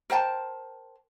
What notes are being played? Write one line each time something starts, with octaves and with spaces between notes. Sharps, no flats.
A#4 C5 G5 A5